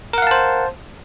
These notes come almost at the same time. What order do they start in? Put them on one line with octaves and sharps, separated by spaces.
A#4 F#5 F5 A5 C5